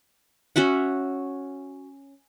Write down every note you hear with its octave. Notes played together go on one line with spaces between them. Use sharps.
C#4 F#4 E5 F#5